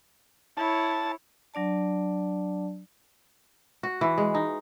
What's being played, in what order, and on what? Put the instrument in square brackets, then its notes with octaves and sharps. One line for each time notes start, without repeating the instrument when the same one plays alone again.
[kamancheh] E4 C#5 [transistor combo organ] A5
[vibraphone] F#3 D4 D5 A5
[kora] F#4
E3
G#3
D#4